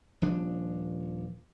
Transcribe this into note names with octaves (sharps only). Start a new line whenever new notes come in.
D#1 F3 D4